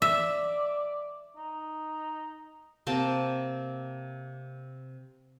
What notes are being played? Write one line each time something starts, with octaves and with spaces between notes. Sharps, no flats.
D5 E5
D#4
C3 A#3 G5 A5